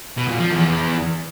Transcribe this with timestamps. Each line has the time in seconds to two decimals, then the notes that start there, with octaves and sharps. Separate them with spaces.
0.18 B2
0.29 A#2
0.40 F3
0.51 E2